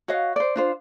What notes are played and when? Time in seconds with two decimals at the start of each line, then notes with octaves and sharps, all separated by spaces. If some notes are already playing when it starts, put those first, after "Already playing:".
0.08 F#4 C#5 D#5 F5
0.36 C5 D5
0.56 D4 F4 C5